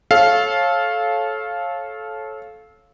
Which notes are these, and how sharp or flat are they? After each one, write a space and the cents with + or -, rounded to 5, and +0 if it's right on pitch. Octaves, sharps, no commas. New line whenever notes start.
A4 -20 C#5 -25 F5 +0